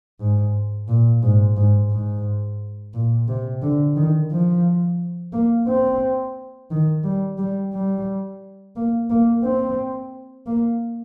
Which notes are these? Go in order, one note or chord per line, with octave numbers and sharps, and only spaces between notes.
G#2
A#2
G#2
G#2
G#2
A#2
C3
D3
D#3
F3
A#3
C4
D#3
G3
G3
G3
A#3
A#3
C4
A#3